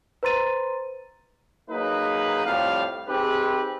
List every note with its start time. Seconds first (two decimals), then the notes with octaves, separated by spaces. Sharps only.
0.23 B4 C5 A#5 C6 A6 D#7
1.70 F#3 A#3 D#4 G#4 B4
2.45 F2 A2 G3 C4 F5
3.08 C4 D#4 G4 G#4 B4